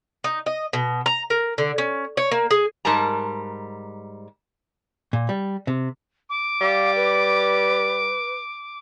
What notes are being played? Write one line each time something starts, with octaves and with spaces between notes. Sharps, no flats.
D#4
D#5
B2
A#5
A#4
D3
C#4
C#5
A#3
G#4
G#2 G3 A#4 A5 A#5
A#2
G3
C3
D6
G3 F5
B4